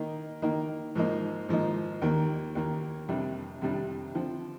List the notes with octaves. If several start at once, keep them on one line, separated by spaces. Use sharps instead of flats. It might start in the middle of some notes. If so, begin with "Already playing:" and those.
Already playing: D#3 A#3 D#4
D#3 A#3 D#4
G#2 F3 A#3 D#4
G#2 F3 A#3 D#4
D#2 D#3 A#3
D#2 D#3 A#3
F2 C3 G3 D4
F2 C3 G3 D4
D3 F3 C4